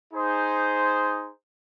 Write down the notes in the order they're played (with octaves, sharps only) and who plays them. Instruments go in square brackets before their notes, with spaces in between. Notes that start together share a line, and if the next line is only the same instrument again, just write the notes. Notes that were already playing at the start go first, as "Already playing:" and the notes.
[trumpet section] D#4 G#4 C5